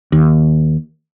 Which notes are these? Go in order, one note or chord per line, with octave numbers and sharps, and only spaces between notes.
D#2